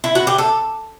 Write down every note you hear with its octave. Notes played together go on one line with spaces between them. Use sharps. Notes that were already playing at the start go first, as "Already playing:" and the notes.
E4
F#4
G4
A4